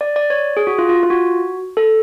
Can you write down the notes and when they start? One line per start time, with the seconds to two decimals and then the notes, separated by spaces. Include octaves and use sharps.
0.01 D5
0.16 D5
0.30 C#5
0.57 G#4
0.67 F#4
0.78 F4
0.89 F4
1.03 F4
1.10 F#4
1.77 A4